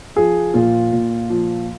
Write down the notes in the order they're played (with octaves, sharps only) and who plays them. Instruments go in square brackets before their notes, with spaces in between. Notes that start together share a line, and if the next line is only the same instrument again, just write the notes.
[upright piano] F3 G#4
A#2 F4
A#2
F3